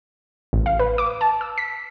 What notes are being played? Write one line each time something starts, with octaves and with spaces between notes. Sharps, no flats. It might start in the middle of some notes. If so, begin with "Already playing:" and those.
A1
F5
B4
D6
A5
E6
B6